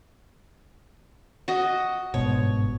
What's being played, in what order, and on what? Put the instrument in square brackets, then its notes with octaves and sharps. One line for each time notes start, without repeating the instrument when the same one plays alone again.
[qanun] F#4 D#5
[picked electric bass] G1 G#2 B2 [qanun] C#5